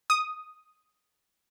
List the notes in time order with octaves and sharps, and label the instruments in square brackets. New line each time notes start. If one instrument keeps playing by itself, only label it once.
[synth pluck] D#6